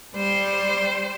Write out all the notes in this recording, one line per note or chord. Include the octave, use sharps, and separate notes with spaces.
G3 C5